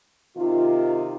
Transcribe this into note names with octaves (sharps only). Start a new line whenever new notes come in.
C3 D#3 F4